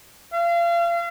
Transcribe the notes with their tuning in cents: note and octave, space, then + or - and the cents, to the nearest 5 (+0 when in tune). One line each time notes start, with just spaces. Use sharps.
F5 -35